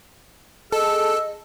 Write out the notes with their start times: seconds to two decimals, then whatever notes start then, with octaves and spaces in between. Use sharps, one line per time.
0.72 G#4 A4 D#5 E6